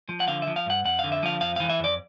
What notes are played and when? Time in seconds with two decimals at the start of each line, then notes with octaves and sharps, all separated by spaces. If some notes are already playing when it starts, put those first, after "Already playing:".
0.09 F3
0.20 F#5
0.28 D3 F5
0.42 E5
0.47 F3
0.56 F5
0.66 G2 F#5
0.85 F2 F#5
0.99 D3 F5
1.12 E5
1.23 F3 F5
1.41 F2 F5
1.56 E3 F5
1.70 E5
1.79 F2 D5